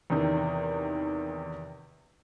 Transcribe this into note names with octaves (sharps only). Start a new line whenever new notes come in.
E2 C3 D#3